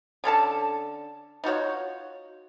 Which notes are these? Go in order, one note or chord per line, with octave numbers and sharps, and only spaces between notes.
D3 C#4 A4 A5
D#4 F4 F#4 C#5